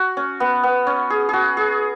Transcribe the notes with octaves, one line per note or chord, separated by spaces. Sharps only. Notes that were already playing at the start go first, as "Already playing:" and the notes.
Already playing: F#4
C#4
B3
B3
C#4
G#4
F#4 G#4
G#4